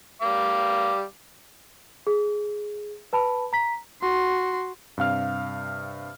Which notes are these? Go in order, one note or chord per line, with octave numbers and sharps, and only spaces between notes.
G3 F5 D6
G#4
B4 A5 B5
A#5 B6
F#4 C6
G2 C3 F5 F6